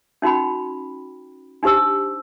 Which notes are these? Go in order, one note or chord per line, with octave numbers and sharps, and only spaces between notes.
C#4 D#4 F#4 G5 B5
D4 D#4 G4 C5 E6